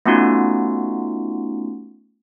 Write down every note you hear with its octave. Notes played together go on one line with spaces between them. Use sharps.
A3 B3 C#4 D#4 F4 F#4